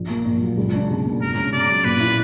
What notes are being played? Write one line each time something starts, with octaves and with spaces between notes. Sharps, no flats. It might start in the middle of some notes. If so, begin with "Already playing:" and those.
Already playing: A#1
A#3
A#2
F#3
C#2
D4
B2
A#3
C#2 A#4
C#4
B2 D5
F#3
A#2 B4
E4